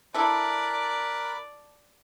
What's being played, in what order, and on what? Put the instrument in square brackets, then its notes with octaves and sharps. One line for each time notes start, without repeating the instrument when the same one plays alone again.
[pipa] D4 E4 A4 [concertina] A#4 B5 F#6 [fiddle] D5